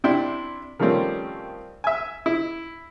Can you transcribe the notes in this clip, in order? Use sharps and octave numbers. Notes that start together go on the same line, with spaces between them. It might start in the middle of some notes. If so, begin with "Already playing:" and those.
C3 D4 E4 G5 C6
D#3 F3 G3 A3 C4 C#4
E5 G#5
E4